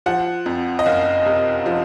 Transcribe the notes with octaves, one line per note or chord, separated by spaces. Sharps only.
F3 F#5
F2
D#5
F#1 F5
C3
F3